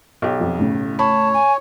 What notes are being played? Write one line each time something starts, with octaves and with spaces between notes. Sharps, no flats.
B1 G4
F2
A2 C#3
C#5 A5 B5
G#5